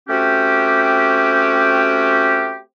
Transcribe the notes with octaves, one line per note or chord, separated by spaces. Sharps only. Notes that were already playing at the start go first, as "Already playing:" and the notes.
A3 C4 C#4 F#4 G4